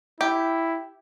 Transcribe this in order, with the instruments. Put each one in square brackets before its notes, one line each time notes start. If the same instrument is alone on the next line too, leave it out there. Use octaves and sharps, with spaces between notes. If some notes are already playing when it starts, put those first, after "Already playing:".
[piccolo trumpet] E4 [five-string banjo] G4